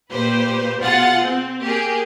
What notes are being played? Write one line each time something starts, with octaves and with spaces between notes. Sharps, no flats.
A#2 G4 B4 C5
B2 F4 G#4 F#5 A6
C4
A#3 G4 G#4